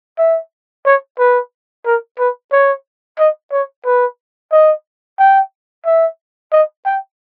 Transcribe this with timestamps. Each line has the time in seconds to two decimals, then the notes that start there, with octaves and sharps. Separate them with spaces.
0.18 E5
0.86 C#5
1.19 B4
1.86 A#4
2.19 B4
2.52 C#5
3.19 D#5
3.52 C#5
3.85 B4
4.52 D#5
5.19 G5
5.86 E5
6.52 D#5
6.86 G5